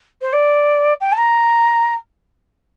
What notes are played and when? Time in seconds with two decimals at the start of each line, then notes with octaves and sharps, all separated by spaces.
0.22 C5
0.33 D5
1.01 G5
1.12 A5
1.18 A#5